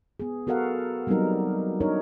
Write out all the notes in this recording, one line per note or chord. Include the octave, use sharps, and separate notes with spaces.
B3 G#4
B3 F#4 A4 A#4 F5 F#5
F#3 G3 B3 C4 D#4 A#4
D4 D#4 A#4 C#5